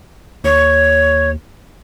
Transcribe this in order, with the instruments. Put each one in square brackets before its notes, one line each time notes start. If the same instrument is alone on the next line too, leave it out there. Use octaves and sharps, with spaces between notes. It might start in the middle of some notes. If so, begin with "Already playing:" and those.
[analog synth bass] D#2 [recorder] C#5